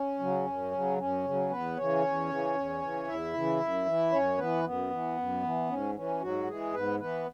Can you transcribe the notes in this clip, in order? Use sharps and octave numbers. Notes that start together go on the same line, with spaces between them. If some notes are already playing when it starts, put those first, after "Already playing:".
Already playing: C#4
C#3 F#3
F#2
C#3 F#3
F#2 C#4
C#3
F#3
E2 B3 B4
C#3 E3 C#4 C#5
E2
C#3 E3
E2
C#3 E3
E2 E4 E5
C#3 E3
F#2
E3
F#2 C#4 C#5
E3 B3 B4
F#2 B3
E3
F#2
E3
G#2 C#4
E3 C#4
G#2 F#3 F#4
E3 G#3 G#4
G#2 B3 B4
E3 B3 B4